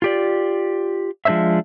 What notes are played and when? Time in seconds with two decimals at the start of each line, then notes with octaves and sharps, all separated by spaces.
0.02 F4 G4 D5
1.25 F3 G#3 D4 C5 C#5 E5